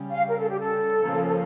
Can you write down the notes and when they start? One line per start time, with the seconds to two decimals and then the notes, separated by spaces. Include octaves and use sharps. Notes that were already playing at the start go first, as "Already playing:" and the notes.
Already playing: C#3 G3 C#4
0.10 F5
0.28 A#4
0.38 A4
0.49 G4
0.59 A4
1.01 C#3 F3 A#3 C#4